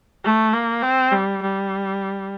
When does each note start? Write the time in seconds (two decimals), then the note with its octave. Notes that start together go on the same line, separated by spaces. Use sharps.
0.24 A3
0.53 A#3
0.83 C4
1.12 G3
1.42 G3